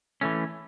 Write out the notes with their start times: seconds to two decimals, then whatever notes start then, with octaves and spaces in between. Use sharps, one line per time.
0.21 E3 A3 C#4